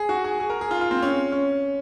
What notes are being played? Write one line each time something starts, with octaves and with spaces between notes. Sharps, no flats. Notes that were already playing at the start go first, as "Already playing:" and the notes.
Already playing: G#4
F#4
G#4
G#4
A#4
G#4
F4
F4
C4
C#4
C#4